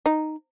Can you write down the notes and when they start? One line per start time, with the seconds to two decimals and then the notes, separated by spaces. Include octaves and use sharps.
0.06 D#4